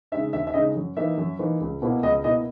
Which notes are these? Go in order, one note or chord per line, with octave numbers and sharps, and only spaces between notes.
C#3 G#3 D#4 E5
D#2 E5
E5
C#3 G#3 D#4 D#5
F#2
E3 A#3 D#4 E5
F#2
E3 A#3 D#4
C#2
B2 A#3 E4
C#2 D#5
B2 A#3 E4 D#5